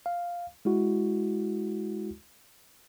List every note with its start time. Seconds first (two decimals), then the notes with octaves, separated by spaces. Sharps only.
0.06 F5
0.65 G#3 E4 F#4